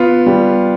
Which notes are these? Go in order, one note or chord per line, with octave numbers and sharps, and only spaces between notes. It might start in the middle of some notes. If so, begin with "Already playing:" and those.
Already playing: B3 F4
G3